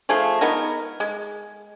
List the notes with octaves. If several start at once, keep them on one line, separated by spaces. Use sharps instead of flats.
F3 A3 G#4 C5
G#3 B3 D#4 A#4
G#3